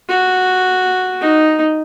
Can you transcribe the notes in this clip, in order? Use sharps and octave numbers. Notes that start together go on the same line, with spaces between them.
F#4
D#4